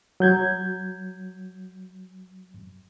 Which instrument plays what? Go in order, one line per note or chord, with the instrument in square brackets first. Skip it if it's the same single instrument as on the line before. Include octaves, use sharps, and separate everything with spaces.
[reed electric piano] F#3 G6 G#6